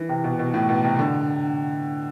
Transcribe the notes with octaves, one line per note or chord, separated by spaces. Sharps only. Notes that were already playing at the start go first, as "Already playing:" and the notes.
Already playing: E3
C3
B2
B2
A2
B2
C3
D3